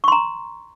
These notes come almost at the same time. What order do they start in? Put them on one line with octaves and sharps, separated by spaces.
C#6 C6 A#5